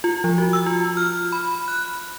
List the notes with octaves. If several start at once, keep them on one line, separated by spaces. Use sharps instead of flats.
F4
F3
F#4
E6
F4
F6
B5
F#6